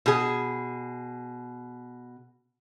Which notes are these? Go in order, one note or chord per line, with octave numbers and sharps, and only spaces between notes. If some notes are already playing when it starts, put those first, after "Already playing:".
B2 G#4